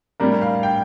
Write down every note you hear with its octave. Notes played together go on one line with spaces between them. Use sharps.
A2 G3 D4 A#4
F5
G5